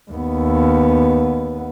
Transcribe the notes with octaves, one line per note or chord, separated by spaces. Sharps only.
D#2 B3